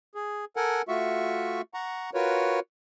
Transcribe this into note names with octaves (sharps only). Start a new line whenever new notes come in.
G#4
A4 A#4 F#5 G#5
A3 F4 F#4 E5 C#6
F#5 A#5 C#6
F4 F#4 A#4 B4 C#5